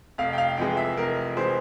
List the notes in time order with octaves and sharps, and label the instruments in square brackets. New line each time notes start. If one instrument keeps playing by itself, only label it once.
[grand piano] F1 F5
G5
F5
F2 E3 G#3 G5
E5
F1 A#4
E3 G#3 C5